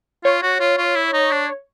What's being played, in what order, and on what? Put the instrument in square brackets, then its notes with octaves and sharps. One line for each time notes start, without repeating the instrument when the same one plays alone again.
[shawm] F4 [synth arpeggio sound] C#5
[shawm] F#4
F4
F4
E4
D#4
D4